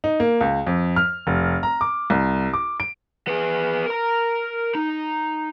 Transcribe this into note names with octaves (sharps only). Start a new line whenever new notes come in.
D#4
A#3
C#2
F2
F6
F1
A#5
D6
C2
D6
D7
B3 G#4
A#4 A#5
D#4